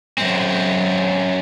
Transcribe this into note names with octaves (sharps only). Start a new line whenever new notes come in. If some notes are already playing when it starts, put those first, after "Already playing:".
F#2 C4